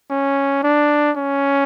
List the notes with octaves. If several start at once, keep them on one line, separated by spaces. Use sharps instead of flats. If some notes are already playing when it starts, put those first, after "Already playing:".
C#4
D4
C#4